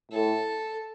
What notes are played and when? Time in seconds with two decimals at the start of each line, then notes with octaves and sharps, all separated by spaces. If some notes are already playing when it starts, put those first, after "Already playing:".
0.12 A2 A4